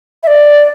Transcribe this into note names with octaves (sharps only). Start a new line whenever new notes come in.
E5
D5